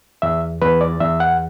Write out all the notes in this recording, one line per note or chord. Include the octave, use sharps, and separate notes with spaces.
E2 E5
E2 B4
D5
E2 E5
F#5